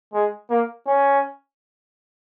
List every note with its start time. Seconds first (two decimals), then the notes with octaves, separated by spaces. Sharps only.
0.13 G#3
0.50 A#3
0.87 C#4